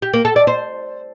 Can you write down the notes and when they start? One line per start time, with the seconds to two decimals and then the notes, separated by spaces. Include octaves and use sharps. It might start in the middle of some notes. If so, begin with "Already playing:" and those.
0.02 G4
0.13 A#3
0.25 A4
0.36 D5
0.47 C5